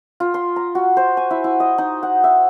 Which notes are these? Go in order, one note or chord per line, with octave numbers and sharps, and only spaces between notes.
F4
C6
A#5
F#4
C5
G#5
E4
E4
D#5
D#4
F#5
E5